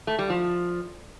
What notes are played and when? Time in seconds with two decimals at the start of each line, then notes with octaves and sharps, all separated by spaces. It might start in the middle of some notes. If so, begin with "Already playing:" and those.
0.07 A3
0.19 G3
0.30 F3